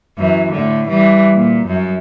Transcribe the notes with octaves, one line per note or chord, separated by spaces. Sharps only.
F#2 E3
A2 D3
E3 G3
A#2
F#2